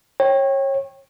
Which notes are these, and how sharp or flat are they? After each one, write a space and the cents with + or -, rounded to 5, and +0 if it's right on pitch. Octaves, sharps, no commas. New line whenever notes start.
C#5 -25 G5 +0